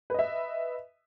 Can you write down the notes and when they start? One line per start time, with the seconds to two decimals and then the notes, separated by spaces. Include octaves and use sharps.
0.10 B4
0.14 D#5
0.19 E5